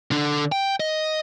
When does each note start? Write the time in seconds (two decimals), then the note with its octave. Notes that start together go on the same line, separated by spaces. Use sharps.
0.11 D3 D4
0.52 G5
0.80 D#5